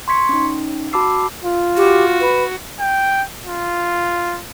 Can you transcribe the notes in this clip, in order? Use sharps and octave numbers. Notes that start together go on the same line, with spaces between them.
C6 C#6 G#6 B6 C#7
C#4 D#4
F#4 A5 B5 D6 E6 C7
F4
F#4 G4
B4
G5
F4